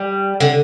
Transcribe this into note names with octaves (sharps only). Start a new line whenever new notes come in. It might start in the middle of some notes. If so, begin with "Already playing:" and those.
Already playing: G3
D3